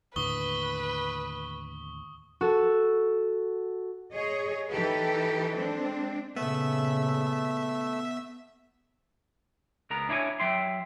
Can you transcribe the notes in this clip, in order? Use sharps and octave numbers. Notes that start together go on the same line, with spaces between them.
D#2 A2 D3 B4 C#6 D#6 G7
F#4 A4
G#4 C#5 D#5
E3 D#4 G4 A4 B4
G#3 C4 D4
A#2 C#3 A3 B3 E5
C#2 B3 A#4 A#5
D4 E4 C#5 D5 G#5
F#3 E5 G5 C6